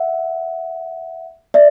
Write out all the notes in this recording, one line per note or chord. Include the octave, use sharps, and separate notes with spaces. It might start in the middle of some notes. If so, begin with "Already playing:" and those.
Already playing: E5 F#5
D5 E5